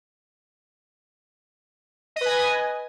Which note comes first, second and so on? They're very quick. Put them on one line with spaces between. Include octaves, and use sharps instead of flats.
D#5 B4 G#5